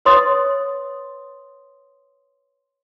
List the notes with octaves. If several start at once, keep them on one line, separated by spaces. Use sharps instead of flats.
B4 C#5 C6 D#6 A6